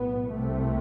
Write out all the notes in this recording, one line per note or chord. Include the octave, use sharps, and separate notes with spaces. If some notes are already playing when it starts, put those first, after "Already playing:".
Already playing: B1 A2 B3
C2 C3 A3